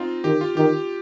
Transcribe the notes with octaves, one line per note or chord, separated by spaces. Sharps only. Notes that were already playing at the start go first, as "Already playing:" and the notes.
Already playing: C4 D#4 F4
D#3 G4
F4
D#3 G4